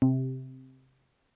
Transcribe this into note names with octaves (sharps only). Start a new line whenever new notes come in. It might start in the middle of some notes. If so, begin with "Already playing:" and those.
C3